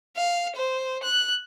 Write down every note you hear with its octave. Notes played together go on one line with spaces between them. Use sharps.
F5
C5
F#6